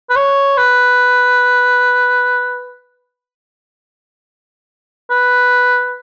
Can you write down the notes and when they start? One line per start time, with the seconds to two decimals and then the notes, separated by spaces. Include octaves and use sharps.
0.10 B4
0.16 C#5
0.57 B4
5.10 B4